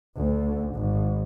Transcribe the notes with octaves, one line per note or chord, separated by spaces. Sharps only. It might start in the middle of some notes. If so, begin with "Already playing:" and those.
D2
G#1